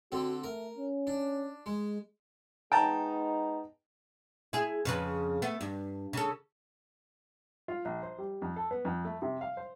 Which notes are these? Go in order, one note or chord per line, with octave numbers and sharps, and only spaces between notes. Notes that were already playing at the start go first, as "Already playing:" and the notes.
D3 C4 F#4
A3 A#4
C#4
D4
G#3
G#3 B3 D#4 G5 A5 A#5
E4 G#4
F2 C#3 B4
A3 B3
G2
C#3 A4
F4
A#1
C5
G3
F2
A4
B3
F2
A3
C3
F5
C5